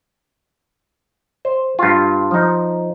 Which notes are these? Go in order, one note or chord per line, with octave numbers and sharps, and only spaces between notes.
C5
G2 F4
F3 D#4